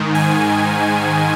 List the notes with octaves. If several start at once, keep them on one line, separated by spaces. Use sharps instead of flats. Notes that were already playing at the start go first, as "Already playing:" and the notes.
Already playing: G#2 D#3
G#5